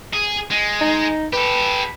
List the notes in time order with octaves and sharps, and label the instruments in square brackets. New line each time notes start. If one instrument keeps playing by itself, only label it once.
[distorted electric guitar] G#4
G#3
[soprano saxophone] D#4
[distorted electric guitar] G4 A4 [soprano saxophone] B4